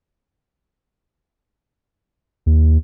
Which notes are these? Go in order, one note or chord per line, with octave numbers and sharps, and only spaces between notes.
D#2